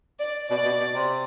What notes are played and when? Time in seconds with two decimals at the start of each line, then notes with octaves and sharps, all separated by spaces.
0.19 D5
0.49 B2 D5
0.65 B2
0.80 B2
0.95 C3